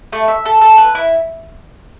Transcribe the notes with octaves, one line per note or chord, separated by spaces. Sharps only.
A3
E5
A4
A4
B4
E4